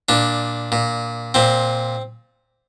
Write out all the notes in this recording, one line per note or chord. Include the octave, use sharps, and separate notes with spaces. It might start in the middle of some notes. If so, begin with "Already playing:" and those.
A#2 D4
A#2
A#2 C4